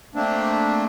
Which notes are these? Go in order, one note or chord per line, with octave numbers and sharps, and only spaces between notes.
A3 A#3 C4 D4